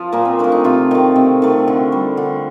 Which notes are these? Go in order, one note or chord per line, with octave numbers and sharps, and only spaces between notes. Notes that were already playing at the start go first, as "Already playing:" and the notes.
Already playing: F3 F4
A#2 A#3
C4
F3 A3 D4
D#4
C3 F4
D#3 A3
C3
D#3 A3
D3
G3
D3